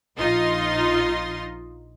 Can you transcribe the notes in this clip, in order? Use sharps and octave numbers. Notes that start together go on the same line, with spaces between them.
A#1 D#4 F4 D#5 C6